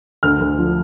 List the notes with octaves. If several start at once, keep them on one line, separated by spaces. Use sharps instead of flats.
D2 F6
D2
F3